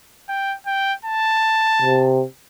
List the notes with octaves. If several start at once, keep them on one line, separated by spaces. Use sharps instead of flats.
G5
G5
A5
C3